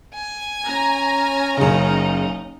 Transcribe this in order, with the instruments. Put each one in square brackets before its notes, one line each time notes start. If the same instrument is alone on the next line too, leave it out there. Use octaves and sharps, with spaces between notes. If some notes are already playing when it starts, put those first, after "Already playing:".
[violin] G#5
[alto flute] C#4 [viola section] A#5
[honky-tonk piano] F#1 C#3 [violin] D#4